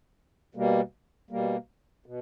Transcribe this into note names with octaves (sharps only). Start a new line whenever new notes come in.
B2 G3 A#3
B2 G3 A#3
B2